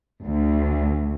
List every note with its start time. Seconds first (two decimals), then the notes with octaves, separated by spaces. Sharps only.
0.23 D2